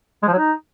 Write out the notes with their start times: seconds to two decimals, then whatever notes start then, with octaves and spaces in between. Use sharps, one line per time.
0.23 G#3
0.28 F3
0.33 F#3
0.38 D#4